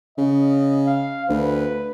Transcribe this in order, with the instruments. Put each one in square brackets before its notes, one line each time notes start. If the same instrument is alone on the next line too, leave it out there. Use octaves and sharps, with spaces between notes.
[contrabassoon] C#3 [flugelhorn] D#5
[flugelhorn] F5
[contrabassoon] D2 [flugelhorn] B4